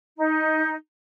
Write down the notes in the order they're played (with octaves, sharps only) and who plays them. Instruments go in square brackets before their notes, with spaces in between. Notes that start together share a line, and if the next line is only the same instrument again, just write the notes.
[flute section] D#4